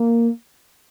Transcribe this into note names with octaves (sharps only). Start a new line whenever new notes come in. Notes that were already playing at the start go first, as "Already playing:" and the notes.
Already playing: A#3